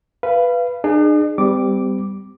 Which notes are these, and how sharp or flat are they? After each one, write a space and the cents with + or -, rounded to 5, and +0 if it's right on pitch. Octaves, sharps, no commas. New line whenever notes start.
B4 +0 F5 -25
D4 +45 G#4 +0
G3 +0 C4 -45 D6 +0